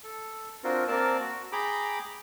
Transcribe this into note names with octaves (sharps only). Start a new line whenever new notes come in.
A4
C4 D4 F4 F#4 A#4 C5
A#3 C4 A#4 D5 A5
F#4
G#4 G5 A#5 B5 D6